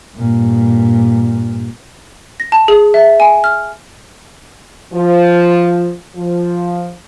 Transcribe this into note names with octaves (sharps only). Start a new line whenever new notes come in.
G2 A#2
A#6
A5
G#4
E5
G#5
F6
F3
F3